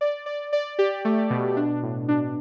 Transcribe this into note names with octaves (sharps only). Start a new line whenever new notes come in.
D5
D5
D5
G4
A3
B2
D4
A2
D4